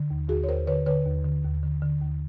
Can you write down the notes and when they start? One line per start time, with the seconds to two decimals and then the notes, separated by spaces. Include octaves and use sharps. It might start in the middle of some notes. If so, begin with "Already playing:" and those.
Already playing: D3
0.10 D#2
0.29 D#2 F#4 G#4
0.43 C#5
0.48 D#2 A#4 C5
0.67 D3 B4 C#5
0.86 D3 B4 C#5
1.05 D#2
1.25 D3
1.44 D#2
1.63 D3
1.82 D3
2.01 D#2